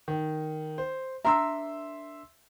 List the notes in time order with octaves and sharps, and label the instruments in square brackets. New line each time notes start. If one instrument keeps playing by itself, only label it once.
[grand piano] D#3
C5
[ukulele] D4 A#4 [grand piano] E5 C6 E6